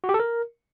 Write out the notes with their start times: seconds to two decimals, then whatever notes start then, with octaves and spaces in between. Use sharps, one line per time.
0.04 F#4
0.09 G4
0.14 A4
0.20 A#4